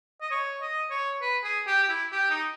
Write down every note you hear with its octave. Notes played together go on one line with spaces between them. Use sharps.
D#5
C#5
D#5
C#5
B4
G#4
G4
G4
E4
G4
D#4